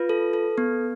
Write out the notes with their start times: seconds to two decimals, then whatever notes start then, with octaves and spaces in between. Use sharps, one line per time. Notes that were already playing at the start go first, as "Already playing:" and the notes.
Already playing: F4 B4
0.09 A4
0.33 A4
0.58 B3